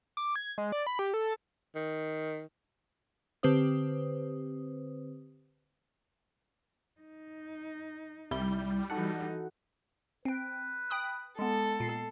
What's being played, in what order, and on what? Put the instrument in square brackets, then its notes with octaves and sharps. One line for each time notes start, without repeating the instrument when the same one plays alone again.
[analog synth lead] D6
G#6
G#3
D5
B5
G4
A4
[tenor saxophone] D#3
[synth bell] D3 C4 G4 B4 C5 D#6
[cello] D#4
[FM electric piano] C2 E4 G6 [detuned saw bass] G3
[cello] E3 D#4 [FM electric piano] F#4 A4 F#5
[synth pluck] C4 G5 [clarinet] B4
[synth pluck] G5 B5 D#6
[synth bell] G#3 B3 [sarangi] A4
[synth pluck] A#2 C7